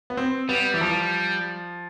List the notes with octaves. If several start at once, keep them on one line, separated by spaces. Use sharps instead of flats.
B3
C4
G3 B3
E3
F3